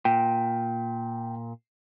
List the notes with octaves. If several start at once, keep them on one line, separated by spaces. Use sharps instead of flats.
A#2 G5